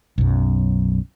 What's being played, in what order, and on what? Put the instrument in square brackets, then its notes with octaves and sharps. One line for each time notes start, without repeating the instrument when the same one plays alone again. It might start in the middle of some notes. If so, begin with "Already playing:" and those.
[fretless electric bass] B1 F#2